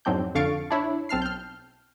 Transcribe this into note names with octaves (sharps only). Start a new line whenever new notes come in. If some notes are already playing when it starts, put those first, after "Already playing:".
F2 G#2 F#3 C4 D4 G6
F2 D3 F5 C#6 A6 D7
D4 E4 C#5
B1 C4 A5 F6 C7
F6 G6